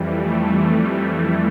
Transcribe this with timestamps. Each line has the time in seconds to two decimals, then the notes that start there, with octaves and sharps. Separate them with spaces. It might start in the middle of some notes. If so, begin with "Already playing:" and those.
Already playing: F2 E3 G3
0.09 A3